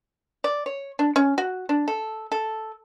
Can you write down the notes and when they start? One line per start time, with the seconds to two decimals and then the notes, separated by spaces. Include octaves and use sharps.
0.44 D5
0.66 C#5
0.99 D4
1.16 C#4
1.38 F#4
1.69 D4
1.88 A4
2.32 A4